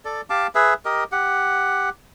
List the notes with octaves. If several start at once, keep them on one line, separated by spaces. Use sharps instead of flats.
A4 D5
G4 F5 A5 D6
G#4 B4 E5
G4 A#4 D#5
G4 F#5